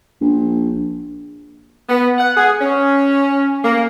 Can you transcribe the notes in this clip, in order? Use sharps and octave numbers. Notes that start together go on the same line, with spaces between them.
A#1
B3
F#5
G#4
C#4
A#3